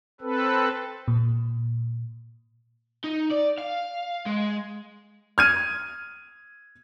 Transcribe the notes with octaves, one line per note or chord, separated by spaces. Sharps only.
C4 A4 B4
A#2
D#4
D5
F5
G#3
F6 G#6 D#7